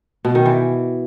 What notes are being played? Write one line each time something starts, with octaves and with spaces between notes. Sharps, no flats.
B2
D#3
E3